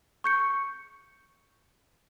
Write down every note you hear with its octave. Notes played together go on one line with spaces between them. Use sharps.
C#6 G6 C#7